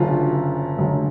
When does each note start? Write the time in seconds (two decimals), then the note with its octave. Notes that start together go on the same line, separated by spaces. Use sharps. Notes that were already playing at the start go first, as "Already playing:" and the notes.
Already playing: F#1 F#2 D3 F4
0.77 F#1 F#2 D3